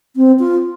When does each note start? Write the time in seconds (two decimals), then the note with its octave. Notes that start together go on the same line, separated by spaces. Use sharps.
0.16 C4
0.39 F4